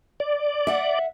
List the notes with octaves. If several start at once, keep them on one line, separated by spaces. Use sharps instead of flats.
D5
E5 F#5